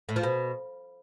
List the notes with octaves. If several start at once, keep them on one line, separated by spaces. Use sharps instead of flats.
A2
F3
B2